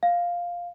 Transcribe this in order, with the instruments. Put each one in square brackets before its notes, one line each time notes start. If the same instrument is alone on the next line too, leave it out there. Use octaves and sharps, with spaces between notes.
[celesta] F5